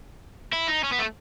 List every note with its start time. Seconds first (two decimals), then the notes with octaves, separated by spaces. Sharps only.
0.53 E4
0.68 D#4
0.83 C#4
0.92 B3
0.98 A3